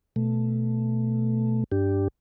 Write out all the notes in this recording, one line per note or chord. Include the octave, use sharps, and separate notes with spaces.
B2 A3
G2 D4 G4